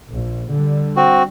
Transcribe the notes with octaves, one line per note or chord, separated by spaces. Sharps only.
A#1
D3 G3
C4 F#4